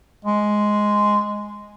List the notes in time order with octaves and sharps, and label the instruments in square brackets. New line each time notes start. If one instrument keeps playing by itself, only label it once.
[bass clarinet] G#3